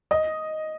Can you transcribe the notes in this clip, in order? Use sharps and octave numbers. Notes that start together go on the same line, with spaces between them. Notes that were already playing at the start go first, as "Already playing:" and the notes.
D#5